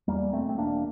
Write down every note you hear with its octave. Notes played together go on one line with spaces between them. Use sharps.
E2 G3 A#3
E1 A3 C4
C4
E1 A#3 D4